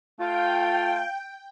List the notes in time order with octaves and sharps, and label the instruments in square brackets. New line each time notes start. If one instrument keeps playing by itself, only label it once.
[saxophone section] A3 F4 [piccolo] F5 [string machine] G5